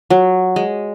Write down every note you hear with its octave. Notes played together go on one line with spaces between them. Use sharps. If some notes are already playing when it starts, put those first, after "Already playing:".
F#3
G#3